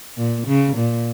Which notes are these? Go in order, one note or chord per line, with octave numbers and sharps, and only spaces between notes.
A#2
C#3
A#2